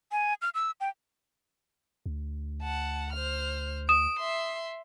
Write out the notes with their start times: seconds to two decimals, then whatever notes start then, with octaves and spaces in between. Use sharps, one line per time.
0.12 G#5
0.42 F6
0.54 E6
0.81 G5
2.06 D2
2.63 F#5 A5
3.13 C5 F6
3.89 D#6 D7 E7
4.20 E5 C6